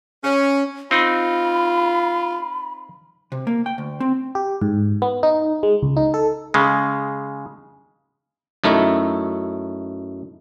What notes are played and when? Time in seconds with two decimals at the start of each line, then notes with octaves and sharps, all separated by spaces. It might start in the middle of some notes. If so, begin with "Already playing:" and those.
0.24 C#4
0.91 C4 D#4 F4 B5
3.32 C3
3.47 A#3
3.66 G5
3.78 D2
4.00 C4
4.35 G4
4.62 G#2
5.02 B3
5.23 D#4
5.63 G#3
5.83 C#2
5.97 D#4
6.14 A4
6.54 C#3 G#3
8.64 F#2 A3 D#4 E4